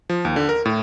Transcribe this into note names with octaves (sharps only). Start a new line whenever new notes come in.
F3
D#2
D3
A#4
A2